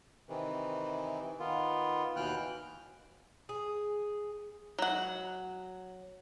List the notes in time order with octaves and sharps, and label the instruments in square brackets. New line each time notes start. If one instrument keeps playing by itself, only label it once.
[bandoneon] C3 D#3 E3
D#3 B3 F4
D#2 B2 E3 G5 F6 F#6
[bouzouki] G#4
[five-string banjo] F#3 F#5